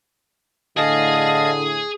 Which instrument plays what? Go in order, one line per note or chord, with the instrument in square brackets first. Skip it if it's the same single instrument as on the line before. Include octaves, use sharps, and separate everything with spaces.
[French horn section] A2 D3 [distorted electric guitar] G#4 G#5 [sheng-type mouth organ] D#5 F5 A5